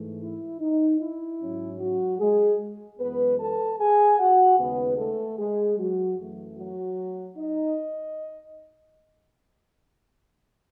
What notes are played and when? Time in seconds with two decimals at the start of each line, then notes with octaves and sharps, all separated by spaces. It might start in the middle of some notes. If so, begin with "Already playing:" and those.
Already playing: G#2 E3 A3
0.21 E4
0.60 D#4
1.00 E4
1.40 G#2 F#3 C#4
1.79 F#3 F#4
2.19 G#3 G#4
2.99 F#2 E3 G#3 B3 B4
3.38 A4 A5
3.79 G#4 G#5
4.19 F#4 F#5
4.58 D#2 C#3 G#3 B3 D#4 B4
4.98 A3 A4
5.38 G#3 G#4
5.78 F#3 F#4
6.19 F#2 E3 A3
6.57 F#3 F#4
7.37 D#4 D#5